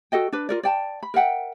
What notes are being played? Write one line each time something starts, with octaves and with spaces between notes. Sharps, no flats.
F#4 A4 D#5 G5
D4 B4
F4 A#4 D5
D5 G5 A5
B5
A#4 E5 F#5 G5